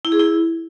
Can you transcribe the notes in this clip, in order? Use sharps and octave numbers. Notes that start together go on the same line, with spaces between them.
E4
G#4
E4